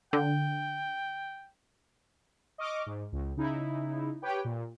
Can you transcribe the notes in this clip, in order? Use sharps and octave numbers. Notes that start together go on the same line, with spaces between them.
D3 G5
D#5 C#6 D6 F6
G#2
C#2
C#3 D#4 E4
G4 B4 C#5 G5
A#2